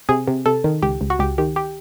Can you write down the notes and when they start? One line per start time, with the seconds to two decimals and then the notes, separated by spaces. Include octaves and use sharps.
0.09 C3 G#4
0.28 C3
0.46 C3 A4
0.64 D#3
0.83 C#2 G4
1.01 C#2
1.10 F#4
1.19 C#2 G4
1.38 D#3 G4
1.56 G4